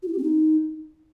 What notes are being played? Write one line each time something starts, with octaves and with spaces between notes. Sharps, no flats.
F#4
E4
G4
C4
D#4